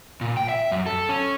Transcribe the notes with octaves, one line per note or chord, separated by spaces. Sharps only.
A#2
G5
E5
F#2
A4
C#4